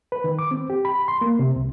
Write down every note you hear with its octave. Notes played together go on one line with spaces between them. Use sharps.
B4
D#3
D6
C4
G4
B5
C6
A#3
C3
C2